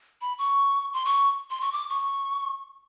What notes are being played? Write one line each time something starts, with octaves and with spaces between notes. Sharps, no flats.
B5
C#6
C6
C#6
C6
C#6
D6
C#6